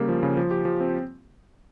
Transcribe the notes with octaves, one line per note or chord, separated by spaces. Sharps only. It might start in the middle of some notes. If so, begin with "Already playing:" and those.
Already playing: C#3 G3 A#3
F3
C#3
F3
G4
F3
C4